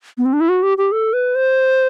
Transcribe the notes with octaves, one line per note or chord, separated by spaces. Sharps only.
B3
C4
D4
E4
F#4
G4
G4
A4
B4
C5